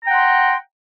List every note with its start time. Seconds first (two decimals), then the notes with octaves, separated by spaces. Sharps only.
0.03 A#5
0.06 G5
0.09 F#5
0.12 C6